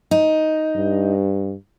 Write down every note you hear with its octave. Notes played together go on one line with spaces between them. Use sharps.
D#4
G2